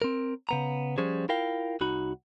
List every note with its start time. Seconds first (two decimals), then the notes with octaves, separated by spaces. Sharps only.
0.02 C4 A#4
0.49 C#3 B3 A#5
0.98 F3 G3 C#4 G#4 C5
1.29 E4 F4 A#4 F5 G5
1.81 C2 D#4 F#4 B5